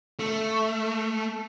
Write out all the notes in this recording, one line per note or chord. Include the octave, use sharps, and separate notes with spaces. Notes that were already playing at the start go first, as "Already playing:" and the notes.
A3